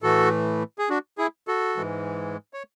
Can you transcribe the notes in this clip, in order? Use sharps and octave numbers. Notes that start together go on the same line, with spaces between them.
A2 E3 A3 F#4 A4
G#4
D4 F#4
E4 G#4
F#4 A4
G#2 E3 G#3
C#5